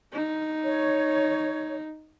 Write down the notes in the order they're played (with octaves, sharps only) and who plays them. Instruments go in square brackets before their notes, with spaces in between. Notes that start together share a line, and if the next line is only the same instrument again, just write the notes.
[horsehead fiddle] D#4
[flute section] C#5